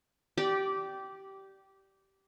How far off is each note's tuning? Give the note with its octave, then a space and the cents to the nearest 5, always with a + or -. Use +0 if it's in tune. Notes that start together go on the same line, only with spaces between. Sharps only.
G4 -15 D5 +0